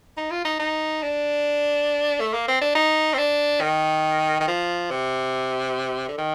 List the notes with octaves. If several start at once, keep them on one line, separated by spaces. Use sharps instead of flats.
D#4
F4
D#4
D#4
D4
A3
A#3
C4
D4
D#4
C4
D4
D#3
D#3
F3
C3
D3
D#3